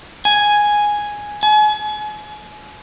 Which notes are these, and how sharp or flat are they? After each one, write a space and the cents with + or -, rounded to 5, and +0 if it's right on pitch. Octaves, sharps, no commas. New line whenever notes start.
G#5 +0
G#5 +35